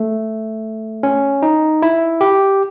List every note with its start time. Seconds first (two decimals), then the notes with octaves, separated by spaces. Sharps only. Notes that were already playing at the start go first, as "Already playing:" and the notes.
Already playing: A3
1.03 C#4
1.42 D#4
1.82 E4
2.21 G4